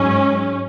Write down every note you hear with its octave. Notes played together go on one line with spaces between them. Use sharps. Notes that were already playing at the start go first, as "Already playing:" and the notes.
Already playing: G#2 F#3 C#4